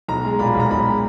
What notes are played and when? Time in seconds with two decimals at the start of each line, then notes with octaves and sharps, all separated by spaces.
0.08 B1 A#5
0.24 G#3
0.39 A#2 B5
0.55 B1 A#5
0.71 B1 B5
0.86 G#3